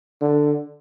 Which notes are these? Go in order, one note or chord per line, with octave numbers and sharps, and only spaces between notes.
D3